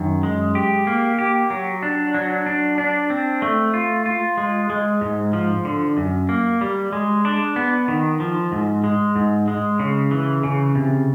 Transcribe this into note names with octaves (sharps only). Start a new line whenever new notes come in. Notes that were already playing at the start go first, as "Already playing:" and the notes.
Already playing: F#2 D#3
G#3
G4
A#3
G4
F#3
D4
F#3
D4
D4
C4
A3
F4
F4
G#3
G#3
G#2
F3
D3
F#2
A#3
G3
G#3
D4
B3
D#3
F3
G#2
G#3
G#2
G#3
C#3
E3
C#3
C3